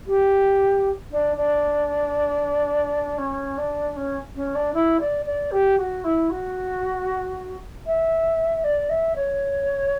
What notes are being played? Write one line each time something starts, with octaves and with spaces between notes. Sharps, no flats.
G4
D4
D4
C#4
D4
C#4
C#4
D4
E4
D5
D5
G4
F#4
E4
F#4
E5
D5
E5
C#5